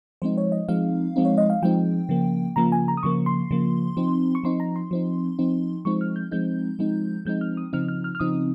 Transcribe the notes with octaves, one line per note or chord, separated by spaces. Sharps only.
F3 G#3 C4 D#4 C5
C#5
D#5
F3 G#3 C4 D#4 F5
F3 G#3 C4 D#4
C#5
D#5
F5
F3 G#3 C4 D#4 G5
C#3 F3 A#3
C#3 F3 A#3 A#5
G#5
A#5
D#6
C#3 F3 A#3 C#6
C6
C#3 F3 A#3
F3 C4 D#4
C#6
F3 C4 D#4 C6
A#5
C6
F3 C4 D#4
F3 C4 D#4
F3 G#3 C4 D#4 C#6
F6
G6
F3 G#3 C4 D#4 G6
F3 G#3 C4 D#4
F3 G#3 C4 D#4 G6
F6
D#6
C#3 F3 C4 D#4 F6
F6
F6
F6
C#3 F3 C4 D#4 D#6